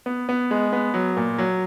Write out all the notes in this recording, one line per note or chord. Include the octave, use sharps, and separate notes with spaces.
B3
B3
G#3
B3
F#3
A#2
F#3